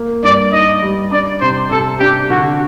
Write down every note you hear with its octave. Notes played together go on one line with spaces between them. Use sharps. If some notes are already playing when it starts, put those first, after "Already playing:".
Already playing: A#3
G2 D5
D#4 D#5
G3
D4 D5
C3 C5
C3 A4
D4 G4
D3 F#4